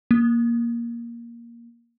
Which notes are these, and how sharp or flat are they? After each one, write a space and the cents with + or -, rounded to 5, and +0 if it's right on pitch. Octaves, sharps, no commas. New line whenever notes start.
A#3 +10